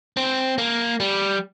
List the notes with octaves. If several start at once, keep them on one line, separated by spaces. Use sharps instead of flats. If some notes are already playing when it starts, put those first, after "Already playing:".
C4
A#3
G3